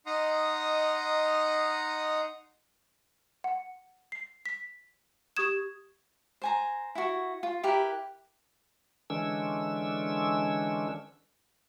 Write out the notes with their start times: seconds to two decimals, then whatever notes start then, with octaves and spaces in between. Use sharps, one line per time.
0.06 D#4 D#5 F#5 A#5 C6 D#6
3.44 F#5
4.12 C7
4.46 B6
5.37 G4 C#6 D#6 G#6 E7
6.42 C5 G#5 A#5
6.95 E4 F#4
7.43 F4
7.63 E4 G4 A#4 B4
9.10 D3 E3 G#3 C#4 D4 E6